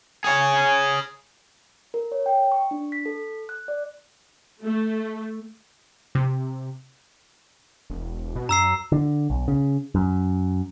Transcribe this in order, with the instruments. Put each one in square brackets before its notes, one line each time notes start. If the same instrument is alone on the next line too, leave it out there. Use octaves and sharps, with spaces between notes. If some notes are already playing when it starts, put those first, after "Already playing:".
[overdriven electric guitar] G#4 C#5
[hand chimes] A#4
C#5
G5
C#6
D4
B6
A4
F#6
D5
[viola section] A3
[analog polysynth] C3
[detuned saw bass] E1
B2
[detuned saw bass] F#2 [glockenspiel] A#5 E6 C7
[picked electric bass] D3
B1
C#3
F#2